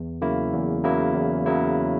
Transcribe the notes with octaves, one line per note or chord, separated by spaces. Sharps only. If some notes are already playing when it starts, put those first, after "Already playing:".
Already playing: E2
C#3 F#3 A#3 E4
E2
C#3 F#3 A#3 E4
E2
C#3 F#3 A#3 E4